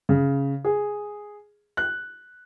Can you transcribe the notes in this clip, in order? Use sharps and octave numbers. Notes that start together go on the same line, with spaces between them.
C#3
G#4
F#6